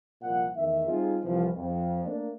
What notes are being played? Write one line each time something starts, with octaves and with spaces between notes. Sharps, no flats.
C2 A#2 F3 F#5
E2 D#3 A3 E5
G3 C4 D#4 F4 G#4
C2 E3 F3
F2
A3 A#3 D4